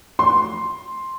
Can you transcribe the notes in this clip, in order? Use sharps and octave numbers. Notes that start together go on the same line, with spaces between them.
C6